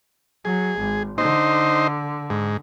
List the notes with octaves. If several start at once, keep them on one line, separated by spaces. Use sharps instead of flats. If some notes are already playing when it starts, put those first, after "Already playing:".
F#3 G#4
G#1
D3 D#4 C5
G#2